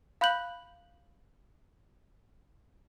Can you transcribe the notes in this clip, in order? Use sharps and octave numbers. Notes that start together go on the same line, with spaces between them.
F5 B5 F#6 G6 F#7